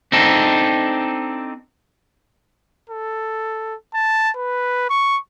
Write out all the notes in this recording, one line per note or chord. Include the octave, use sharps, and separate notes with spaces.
C4 D4 D#4 A4
A4
A5
B4
C#6